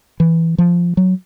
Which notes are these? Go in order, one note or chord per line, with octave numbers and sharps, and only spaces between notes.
E3
F3
F#3